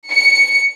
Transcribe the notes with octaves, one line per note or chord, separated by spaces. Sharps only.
C#7